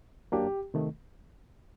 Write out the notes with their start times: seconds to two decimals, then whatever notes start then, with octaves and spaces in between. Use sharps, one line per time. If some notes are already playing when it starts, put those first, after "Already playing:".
0.32 F#2 F#3 A#3 D4 G4
0.74 C3 D#3 A3